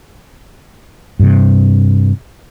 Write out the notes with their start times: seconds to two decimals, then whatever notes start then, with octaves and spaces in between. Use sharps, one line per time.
1.19 G2 C3